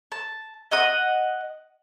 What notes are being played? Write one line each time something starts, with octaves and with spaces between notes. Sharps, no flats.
A5
D#5 F#5 D#6